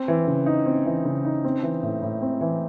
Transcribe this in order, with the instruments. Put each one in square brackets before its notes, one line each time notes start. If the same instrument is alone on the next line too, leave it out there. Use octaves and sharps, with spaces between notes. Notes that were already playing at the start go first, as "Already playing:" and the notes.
Already playing: [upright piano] C4
E3
C#3
D#4
C4
E3
C#3
D#4
C4
E3
A2
A2
C4
E3